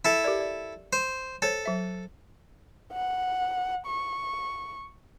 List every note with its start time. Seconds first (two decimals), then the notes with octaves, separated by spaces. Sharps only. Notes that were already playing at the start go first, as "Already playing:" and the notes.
0.05 E4 A4
0.24 G4 A#4 D5
0.40 D5
0.93 C5
1.42 A4 C5 C#5
1.65 F#3 E5
2.93 F#5
3.86 C#6